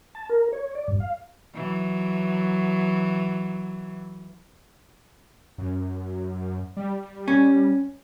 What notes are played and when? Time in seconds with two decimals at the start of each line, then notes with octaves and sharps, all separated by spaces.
0.15 A5
0.29 A#4
0.53 C#5
0.75 D5
0.88 G2
1.00 F5
1.54 E3 F#3
5.58 F#2
6.77 G3
7.28 C#4